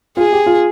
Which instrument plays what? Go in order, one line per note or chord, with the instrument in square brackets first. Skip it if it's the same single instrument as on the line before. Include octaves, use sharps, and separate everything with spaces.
[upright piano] F4 [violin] G#4
[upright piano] G4
F4